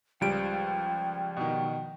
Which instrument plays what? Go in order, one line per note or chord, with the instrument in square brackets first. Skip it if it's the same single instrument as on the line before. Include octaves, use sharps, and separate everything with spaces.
[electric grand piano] C#2 G3 D7 [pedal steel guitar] F3 [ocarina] G5
[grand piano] B2 D#3